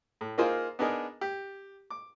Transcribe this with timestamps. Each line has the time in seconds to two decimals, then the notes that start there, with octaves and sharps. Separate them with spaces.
0.21 A2
0.38 A#3 D#4 F4 G#4 A#4 C5
0.79 B3 D4 D#4 G#4 A#4
1.21 G4
1.91 D6